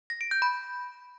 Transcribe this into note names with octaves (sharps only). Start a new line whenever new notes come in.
A#6
D7
G6
B5